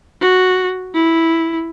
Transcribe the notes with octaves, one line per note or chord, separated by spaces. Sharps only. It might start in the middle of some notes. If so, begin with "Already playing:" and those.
F#4
E4